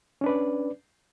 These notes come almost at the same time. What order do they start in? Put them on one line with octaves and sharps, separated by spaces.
C#4 D4 B4 D5